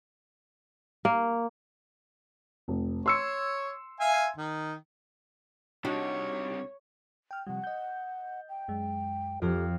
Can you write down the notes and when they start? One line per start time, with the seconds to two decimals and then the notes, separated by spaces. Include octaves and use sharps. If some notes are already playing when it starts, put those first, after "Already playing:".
1.05 A#3
2.68 F1
3.06 C#5 C6 E6 C#7
4.00 E5 F5 G#5
4.37 D#3
5.84 C3 G3 D4 D#4 F#4 G4 C#5
7.31 G5 F6
7.47 C3 F3 G3 F#5
7.64 D#5 G6
8.49 G5
8.68 F#2 G#3
9.42 F2 F3 G4 A4